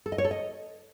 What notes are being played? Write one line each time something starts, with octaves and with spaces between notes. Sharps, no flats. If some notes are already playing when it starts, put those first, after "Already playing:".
A4
D#5
C#5
A4
D#5